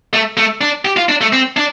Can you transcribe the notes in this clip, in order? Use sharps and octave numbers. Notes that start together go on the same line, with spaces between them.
A3
A3
D4
G4
F4
D4
A3
C4
D4